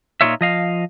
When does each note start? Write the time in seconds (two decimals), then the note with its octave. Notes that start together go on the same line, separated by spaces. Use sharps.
0.21 A#2 F3 D#4 F4 C#5 E5
0.41 F3 D#5 F5